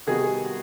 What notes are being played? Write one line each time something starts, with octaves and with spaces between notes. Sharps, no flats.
C3 D#3 G3 B3 F#4 G#4